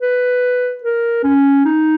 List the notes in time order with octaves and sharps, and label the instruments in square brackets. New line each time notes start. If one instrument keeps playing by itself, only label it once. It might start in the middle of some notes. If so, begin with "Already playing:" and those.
[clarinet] B4
A#4
C#4
D#4